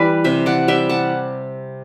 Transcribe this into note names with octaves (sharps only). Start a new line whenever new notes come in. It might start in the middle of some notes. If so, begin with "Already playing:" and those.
Already playing: E3 G3 B4 D5
C3 C5 E5
D5 F#5
G3 E5 G5
F#5 A5